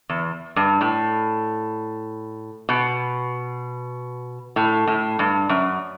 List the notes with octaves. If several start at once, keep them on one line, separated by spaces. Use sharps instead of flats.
E2
G2
A2
B2
A2
A2
G2
F#2